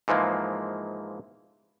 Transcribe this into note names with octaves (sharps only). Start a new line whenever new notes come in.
G#2 E3 F3 G#3 A#3